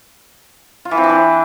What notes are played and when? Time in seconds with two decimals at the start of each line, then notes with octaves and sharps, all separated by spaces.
0.85 F4
0.91 E3
0.97 C4
1.03 D4
1.10 E3